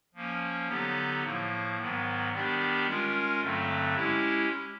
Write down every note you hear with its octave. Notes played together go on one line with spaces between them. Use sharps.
F3 A#3 C#4
D3 F#3 B3 D#4 G4
A2 F3 A#3
G#2 D#3 F#3 B3
D#3 G3 B3 D4 G4
G#3 C#4 F4 A#4
G2 D3 F#3 A3 C4
G#3 C#4 E4 G4